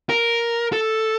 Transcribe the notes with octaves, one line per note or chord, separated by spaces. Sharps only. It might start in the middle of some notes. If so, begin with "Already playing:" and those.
A#4
A4